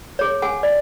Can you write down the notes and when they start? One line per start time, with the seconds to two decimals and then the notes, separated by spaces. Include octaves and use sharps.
0.19 G#4 C#5
0.42 G#4 F#5 G#5
0.63 D5